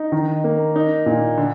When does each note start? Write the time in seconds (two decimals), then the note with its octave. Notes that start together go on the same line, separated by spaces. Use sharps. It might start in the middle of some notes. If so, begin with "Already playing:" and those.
Already playing: D#4
0.12 D#3
0.44 A#3
0.76 D#4
1.06 A#2
1.38 D3